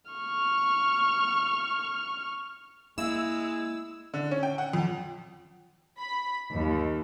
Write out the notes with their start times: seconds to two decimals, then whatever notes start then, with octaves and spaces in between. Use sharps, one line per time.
0.11 C#6 F6
2.98 G#3 A#3 E4 E6
4.14 D3
4.31 C#4
4.43 G5
4.58 F#5
4.73 F2
5.99 B5
6.54 D#2